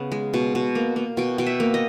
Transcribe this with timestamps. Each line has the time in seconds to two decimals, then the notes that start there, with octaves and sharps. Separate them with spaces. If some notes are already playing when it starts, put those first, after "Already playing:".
Already playing: C#3 B3
0.12 G#3
0.34 B2
0.55 B2
0.75 A#3
0.96 A#3
1.17 B2 G5
1.38 B2 G5
1.46 E5
1.60 A#3
1.74 D#5